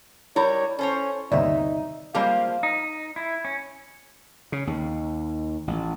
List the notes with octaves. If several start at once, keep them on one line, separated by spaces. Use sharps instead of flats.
G3 E4 A#4 C#5 B5
C#4 A4 C5 C#5
G1 D#2 C3 D#4 D5 E5
F3 G3 G#3 A#3 C4 G4 F5
D#4
E4
C#4
C#3
D#2
A1